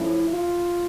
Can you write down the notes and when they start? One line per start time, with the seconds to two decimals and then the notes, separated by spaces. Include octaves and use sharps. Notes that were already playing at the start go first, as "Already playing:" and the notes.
Already playing: A2 F3 A3 C#4 E4
0.29 F4